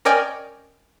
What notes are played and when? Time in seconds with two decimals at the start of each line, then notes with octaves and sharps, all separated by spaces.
0.05 C#4 A#4 D5 D#5 G5 G#5